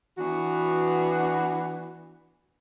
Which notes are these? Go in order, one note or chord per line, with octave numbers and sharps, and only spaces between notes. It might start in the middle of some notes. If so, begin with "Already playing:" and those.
E3 B3 D4 F#4